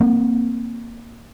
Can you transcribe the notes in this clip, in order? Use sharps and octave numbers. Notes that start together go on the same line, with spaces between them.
A#3 C4